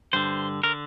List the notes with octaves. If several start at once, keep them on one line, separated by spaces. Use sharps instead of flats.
G2 D3 C5
D3 A#4